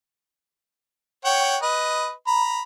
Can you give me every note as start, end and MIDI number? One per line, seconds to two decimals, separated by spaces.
1.25 1.57 73
1.25 1.57 78
1.25 1.57 79
1.62 2.11 71
1.62 2.11 75
2.27 2.63 82
2.27 2.63 83